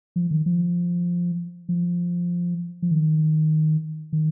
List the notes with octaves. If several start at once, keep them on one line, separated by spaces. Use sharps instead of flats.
F3
D#3
F3
F3
F3
D#3
D#3